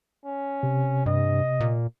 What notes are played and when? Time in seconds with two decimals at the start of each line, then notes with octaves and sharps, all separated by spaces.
0.25 C#4
0.63 C3
1.06 G2 D#5
1.60 A#2